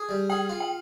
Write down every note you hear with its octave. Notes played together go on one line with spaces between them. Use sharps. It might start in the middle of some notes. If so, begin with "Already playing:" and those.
Already playing: G#4
G3
G#4 G5
F4
G5